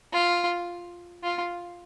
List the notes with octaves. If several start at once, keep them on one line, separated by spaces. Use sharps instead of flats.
F4
F4